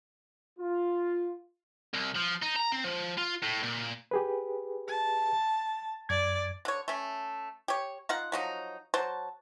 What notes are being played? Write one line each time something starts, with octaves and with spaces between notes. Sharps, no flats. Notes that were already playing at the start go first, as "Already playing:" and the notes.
F4
C2
F3
D#4
A#5
C4
F3
F4
A2
A#2
G4 G#4 B4
A5
F#2 D5 G#6
D3 C#5
A3 C#4
G4 C#5
D#4 F4 F#5
F3 F#3 D#4
F#3 C5 A5